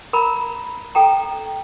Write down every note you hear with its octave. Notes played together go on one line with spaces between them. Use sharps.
A#4 A#5 B5
A4 G5 A#5